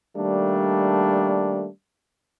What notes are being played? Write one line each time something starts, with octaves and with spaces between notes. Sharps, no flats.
D#3 G3 A3 A#3 D4